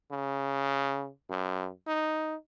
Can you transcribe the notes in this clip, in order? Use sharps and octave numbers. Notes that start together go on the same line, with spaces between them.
C#3
F#2
D#4